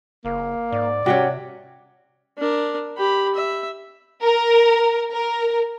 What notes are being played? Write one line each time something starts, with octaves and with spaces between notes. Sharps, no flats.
F#1 A#3
G#2 D5
C3 C#4 D4 F#4 G4
D4 A#4
G4 B5
E5
A#4
A#4